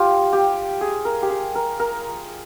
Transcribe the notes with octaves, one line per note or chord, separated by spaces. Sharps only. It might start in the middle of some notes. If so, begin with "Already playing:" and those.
Already playing: F4 G4
G4
G#4
A#4
G4
G#4
A#4
A#4